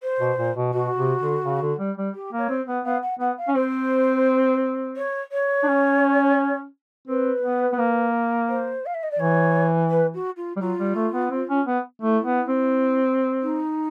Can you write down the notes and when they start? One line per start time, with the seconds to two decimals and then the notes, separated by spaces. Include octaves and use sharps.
0.03 C5
0.20 B2
0.38 A#2
0.56 B2
0.73 B2 F#4
0.97 C3
1.21 D3
1.45 C#3
1.62 D3
1.79 G3
1.97 G3
2.14 G4
2.33 A#3
2.38 C#5
2.49 C4
2.68 B3
2.85 B3 F5
3.02 F#5
3.20 B3 F#5
3.38 F5
3.48 C#4
3.56 C4 C5
4.97 C#5
5.32 C#5
5.63 D4
5.68 C#4
7.08 C4 B4
7.43 B3
7.72 B3
7.79 A#3
8.49 C5
8.86 F5
8.94 E5
9.03 D#5
9.11 D5
9.19 E3 C#5
9.90 B4
10.14 F#4
10.37 F4
10.57 G3
10.61 F#3 F4
10.79 G3
10.95 A3
11.14 B3
11.31 C4
11.49 C#4
11.67 B3
12.01 A3 E4
12.25 B3
12.48 C4
13.43 D#4